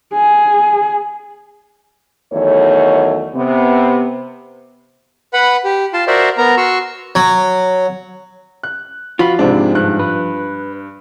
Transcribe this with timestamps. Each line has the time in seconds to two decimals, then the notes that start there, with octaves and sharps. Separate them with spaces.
0.14 G#4
2.33 E2 D#3 F#3 A3 C#5
3.35 C3 B3
5.33 B4 F#5 B5
5.65 G4
5.93 F4 A5 C6
6.07 F#4 A#4 C5 D5 E5
6.38 B3 A#4 A#5
6.57 F#4 C6 C#6 E6
7.15 F#3
8.63 F#6
9.19 F3 F4 F#4 B5
9.39 G#2 C3 C4 D4
9.75 G2 F#6
9.99 B4